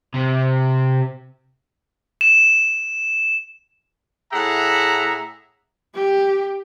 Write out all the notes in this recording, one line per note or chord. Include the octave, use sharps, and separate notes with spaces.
C3
E7
A2 G#4 E5 F#5 A#5
G4